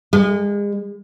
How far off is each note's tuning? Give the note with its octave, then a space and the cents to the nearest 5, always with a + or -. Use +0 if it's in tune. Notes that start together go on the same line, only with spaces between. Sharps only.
G#3 -35